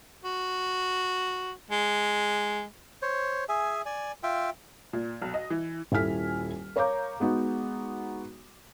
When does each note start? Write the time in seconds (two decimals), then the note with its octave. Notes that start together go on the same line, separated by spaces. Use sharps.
0.24 F#4
1.71 G#3
3.02 C5 C#5
3.49 G#4 E5 G#5
3.86 D5 G#5
4.23 F4 E5 G5
4.93 A#2
5.22 B1
5.34 D#5
5.50 E3
5.92 D#1 E4 A4 G#5 F6 B6
6.76 A#4 C#5 F5 A#5 D6 G6
7.20 G#3 B3 D#4 F#4